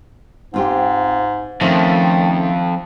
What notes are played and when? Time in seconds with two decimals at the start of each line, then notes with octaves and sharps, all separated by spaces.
0.54 G#2 C4 F4 G4
1.61 F2 D#3 F3 A3 C#4